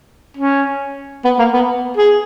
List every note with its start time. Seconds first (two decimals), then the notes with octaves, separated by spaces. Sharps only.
0.37 C#4
1.25 B3
1.39 A#3
1.53 B3
1.97 G#4